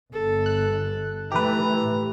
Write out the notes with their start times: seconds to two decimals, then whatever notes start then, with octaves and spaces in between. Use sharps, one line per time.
0.13 G1 A4
0.46 F#6
1.32 E3 A3 G4 B4 A#5
1.81 A2